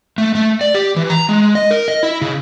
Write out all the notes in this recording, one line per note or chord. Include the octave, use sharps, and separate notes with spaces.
A3
A3
D5
G4
E3
A#5
G#3
D#5
A#4
D#5
E4
C#3